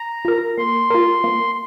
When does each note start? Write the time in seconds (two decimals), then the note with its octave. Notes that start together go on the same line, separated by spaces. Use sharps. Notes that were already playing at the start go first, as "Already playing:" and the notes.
Already playing: A#5
0.25 F4 A#4
0.58 A#3 C6
0.90 F4 A#4
1.24 A#3